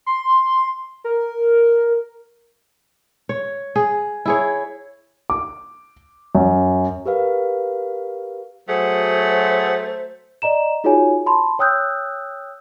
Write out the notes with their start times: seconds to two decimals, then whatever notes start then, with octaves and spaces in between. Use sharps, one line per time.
0.06 C6
1.04 A#4
3.29 C#5
3.76 G#4
4.26 E4 G#4 C#5
5.30 D6
6.35 F#2
7.06 G4 A#4 B4 F5
8.68 F#3 A3 G#4 C5 F#5
10.42 D5 D#5 A#5 E7
10.84 D#4 F4 F#4 G#4 C#5 G#5
11.26 A5 B5 C6
11.59 C#5 G5 D#6 E6 F#6 G6